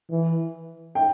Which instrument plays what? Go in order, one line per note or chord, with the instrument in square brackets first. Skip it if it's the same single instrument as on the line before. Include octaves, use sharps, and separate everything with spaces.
[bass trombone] E3
[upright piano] G5